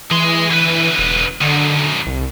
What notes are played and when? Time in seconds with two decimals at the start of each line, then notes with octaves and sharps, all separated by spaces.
0.11 E3 G#4 C6
0.51 D3 B4
0.99 E1
1.41 F#2 D3 D#3
2.06 C2